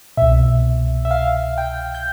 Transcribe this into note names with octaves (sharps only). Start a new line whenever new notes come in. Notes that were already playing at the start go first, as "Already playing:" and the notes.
C2 B2 E5
E5
F5
G5
G6